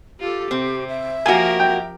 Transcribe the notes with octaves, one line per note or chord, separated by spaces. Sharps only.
F4 G4 A4
C3 C4
E5
F3 A#3 F#4 G4 A#4 G#5
G5